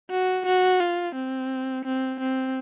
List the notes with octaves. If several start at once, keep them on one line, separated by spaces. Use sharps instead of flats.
F#4
F#4
F4
C4
C4
C4